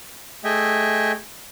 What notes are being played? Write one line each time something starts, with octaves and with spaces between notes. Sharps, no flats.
A3 G#4 D#5 E5 G5